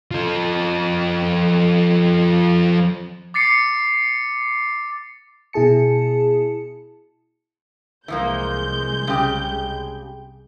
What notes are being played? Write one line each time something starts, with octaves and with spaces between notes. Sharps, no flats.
F3 A4
D6 A6 C7 C#7
B2 E4 G#4 A5 C#7
C2 E3 F3 G#3 A#3 G6
C#3 G4